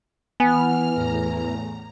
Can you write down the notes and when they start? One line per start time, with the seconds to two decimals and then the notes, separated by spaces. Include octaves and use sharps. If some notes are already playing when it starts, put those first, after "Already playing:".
0.40 E3 B3 G#5 F6
0.94 E2 A2 A#5